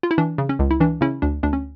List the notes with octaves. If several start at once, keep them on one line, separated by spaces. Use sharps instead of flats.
F4
E4
E3 D4
C#3
C#4
C#2
E4
E3 D4
C#3 C#4 E4
D2 D4
D2 D4
C#4